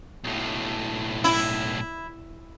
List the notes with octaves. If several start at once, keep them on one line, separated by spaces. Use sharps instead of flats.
B1 A2
E4